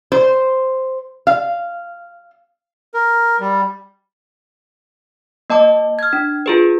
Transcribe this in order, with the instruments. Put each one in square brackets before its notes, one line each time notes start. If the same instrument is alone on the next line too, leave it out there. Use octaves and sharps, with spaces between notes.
[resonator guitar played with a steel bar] C5
F5
[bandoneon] A#4
G3
[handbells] A#3 D#5 A5 D6
F6 G#6
D4
F4 G#4 B4